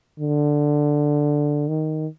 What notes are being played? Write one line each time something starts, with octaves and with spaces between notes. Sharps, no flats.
D3
D#3